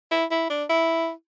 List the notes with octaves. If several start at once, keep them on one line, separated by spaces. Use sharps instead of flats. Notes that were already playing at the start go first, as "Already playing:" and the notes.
E4
E4
D4
E4